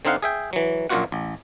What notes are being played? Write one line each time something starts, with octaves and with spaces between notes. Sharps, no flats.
D3 C4 D#4 F5 F#5
G#4 E5 G5
E3 F#3
A#1 F#2 A#2 F4 F#4 F#5
A1